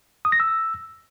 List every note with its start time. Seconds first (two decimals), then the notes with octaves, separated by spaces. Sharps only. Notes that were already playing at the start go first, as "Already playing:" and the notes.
0.25 D#6
0.32 A#6
0.40 E6